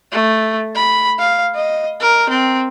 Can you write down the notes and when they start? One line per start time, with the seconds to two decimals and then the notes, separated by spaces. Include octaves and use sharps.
0.12 A3
0.75 B5
1.19 F5
1.55 D#5
2.00 A#4
2.29 C4